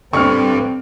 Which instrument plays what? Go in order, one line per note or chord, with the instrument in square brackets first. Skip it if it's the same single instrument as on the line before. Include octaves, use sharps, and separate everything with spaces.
[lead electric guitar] D2 G2 [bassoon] D3 [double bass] C4 [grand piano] C#6 F6